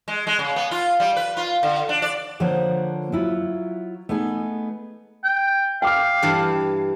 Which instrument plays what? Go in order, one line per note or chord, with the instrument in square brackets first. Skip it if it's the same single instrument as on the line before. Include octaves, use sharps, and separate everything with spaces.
[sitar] G#3
G#3
C#3
B3
F4
G3
B4
F4
D3
D4
D5
[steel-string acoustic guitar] D3 F3 A#3 C5 C#5 F#5
F#3 E4 F4
A3 B3 D#4 G#4
[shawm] G5
[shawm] F5 [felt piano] G5 D6 F6
[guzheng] G2 E3 A5